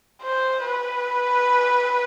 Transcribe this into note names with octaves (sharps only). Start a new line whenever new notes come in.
C5
B4